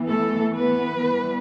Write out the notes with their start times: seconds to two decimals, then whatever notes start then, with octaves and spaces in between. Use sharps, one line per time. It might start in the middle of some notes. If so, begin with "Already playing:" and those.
Already playing: E3 B3
0.09 A3 A4
0.55 B3 B4
1.01 E3 G3 B3